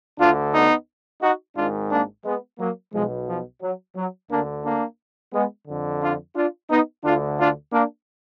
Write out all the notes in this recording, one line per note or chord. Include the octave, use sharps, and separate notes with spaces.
D2 D3 D4 F4
B3 D#4
D#4 F#4
G#1 G#2 D#3 D4 F4
A#3 D4
G#3 B3
F#3 A#3
B1 B2 F3 G#3
F3
F#3
F#3
D2 D3 A#3 D4
A#3 D4
G#3 B3
F2 D3
D4 F4
D4 F4
B3 D#4
D2 D3 D4 F4
D4 F4
A#3 D4